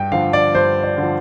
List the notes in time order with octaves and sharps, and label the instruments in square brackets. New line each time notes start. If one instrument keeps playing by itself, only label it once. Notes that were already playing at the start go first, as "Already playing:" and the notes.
Already playing: [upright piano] G2 [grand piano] G5
[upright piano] D3 F3 [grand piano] F5
[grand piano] D5
[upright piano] G2 [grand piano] C5
[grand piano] D5
[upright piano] D3 F3